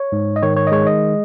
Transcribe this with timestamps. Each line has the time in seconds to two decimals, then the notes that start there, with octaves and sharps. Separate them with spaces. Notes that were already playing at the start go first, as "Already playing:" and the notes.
Already playing: C#5
0.12 G#2
0.36 D#5
0.43 D#3 C#5
0.57 C#5
0.67 D#5
0.72 G#3 C#5
0.87 D#5